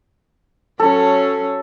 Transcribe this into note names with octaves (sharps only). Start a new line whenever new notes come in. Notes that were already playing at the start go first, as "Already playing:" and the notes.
F#3 C#4 A4